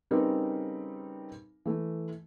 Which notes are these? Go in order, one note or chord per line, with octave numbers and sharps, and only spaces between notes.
C#3 G3 C4 D#4 A#4 B4
E3 A3